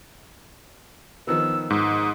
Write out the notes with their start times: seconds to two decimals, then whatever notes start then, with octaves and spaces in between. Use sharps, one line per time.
1.27 D#3 F3 B3 E6
1.70 G#2 D#6